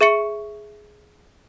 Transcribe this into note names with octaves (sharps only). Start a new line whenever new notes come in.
G#4 E5 C#6 C#7